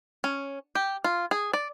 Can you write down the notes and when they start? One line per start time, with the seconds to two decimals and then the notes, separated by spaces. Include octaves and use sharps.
0.24 C#4
0.75 G4
1.04 F4
1.31 G#4
1.53 D5